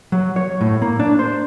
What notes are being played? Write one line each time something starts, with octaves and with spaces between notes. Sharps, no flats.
F#3
C#5
A2
A#3
D4
C5